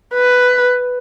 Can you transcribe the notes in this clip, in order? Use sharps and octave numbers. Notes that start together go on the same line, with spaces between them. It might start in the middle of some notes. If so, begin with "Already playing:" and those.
B4